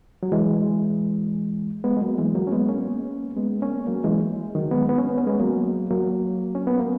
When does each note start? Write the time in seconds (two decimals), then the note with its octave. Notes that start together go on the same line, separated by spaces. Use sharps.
0.23 F#3
0.32 E3 G#3
1.84 G#3 B3
1.97 G#3
2.01 F#3 A#3
2.18 E3 G#3
2.35 F#3 A#3
2.47 C#4
2.52 G#3 B3
2.69 A#3 C#4
3.37 G#3 B3
3.62 A#3 C#4
3.87 F#3 A#3
4.04 E3 G#3
4.55 D#3 F#3
4.71 G#3 B3
4.89 B3
4.98 C#4
5.08 B3
5.17 C#4
5.27 G#3 B3
5.40 F#3 A#3
5.91 F#3 A#3
6.55 C#4
6.67 B3
6.80 A#3